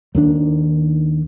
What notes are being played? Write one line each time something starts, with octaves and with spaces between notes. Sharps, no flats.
D#2 D#3 D4